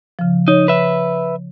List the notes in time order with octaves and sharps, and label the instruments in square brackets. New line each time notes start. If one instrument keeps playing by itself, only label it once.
[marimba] C#3 F3
[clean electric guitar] D#4 [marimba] C#5
[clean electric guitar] B4 E5